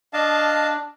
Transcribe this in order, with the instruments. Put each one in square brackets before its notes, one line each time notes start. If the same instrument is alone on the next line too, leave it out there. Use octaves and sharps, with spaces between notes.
[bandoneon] D4 [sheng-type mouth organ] D#5 F5 A5